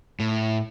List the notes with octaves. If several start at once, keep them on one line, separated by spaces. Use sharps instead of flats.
A2